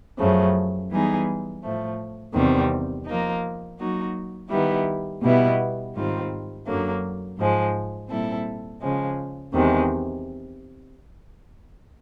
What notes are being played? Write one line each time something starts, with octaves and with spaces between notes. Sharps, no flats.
F#2 C#3 F3 A3
E3 G3 B3 D#4 G#4
A2 F3 A3
E2 C3 D#3 G3 C4
F3 A#3 D#4
F#3 A#3 D#4 F#4
D#3 G3 B3 E4
B2 G3 B3 E4
G#2 D#3 G3 C4 F4
F#2 D3 F#3 A#3
G#2 F3 G#3
A#2 G3 C4 E4 A4
C#3 F3 G#3
E2 C3 D#3 G#3